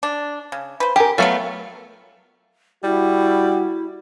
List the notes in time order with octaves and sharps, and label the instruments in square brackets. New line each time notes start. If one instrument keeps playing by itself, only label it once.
[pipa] D4
C#3
B4 C5
[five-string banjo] G4 A#4 [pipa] G#4
[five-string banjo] F#3 A3 B3 [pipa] F4 F#4 A4
[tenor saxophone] G3 [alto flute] E4 [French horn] F#4